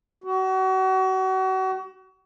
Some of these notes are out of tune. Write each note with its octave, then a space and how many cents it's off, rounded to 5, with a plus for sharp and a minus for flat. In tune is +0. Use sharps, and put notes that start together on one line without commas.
F#4 +35